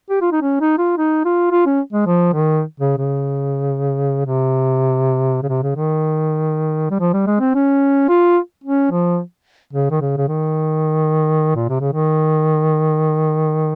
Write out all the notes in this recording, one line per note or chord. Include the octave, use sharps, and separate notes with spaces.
G4
F4
D#4
C#4
D#4
F4
D#4
F4
F4
C#4
G#3
F3
D#3
C#3
C#3
C3
C#3
C3
C#3
D#3
G3
F3
G3
G#3
C4
C#4
F4
C#4
F3
C#3
D#3
C#3
C#3
D#3
A#2
C3
C#3
D#3